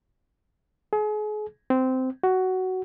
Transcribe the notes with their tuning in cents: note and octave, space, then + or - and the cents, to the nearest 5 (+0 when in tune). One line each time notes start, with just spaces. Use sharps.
G#4 +35
C4 -15
F#4 +10